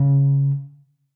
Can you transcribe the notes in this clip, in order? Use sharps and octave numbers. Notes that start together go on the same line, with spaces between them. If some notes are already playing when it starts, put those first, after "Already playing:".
Already playing: C#3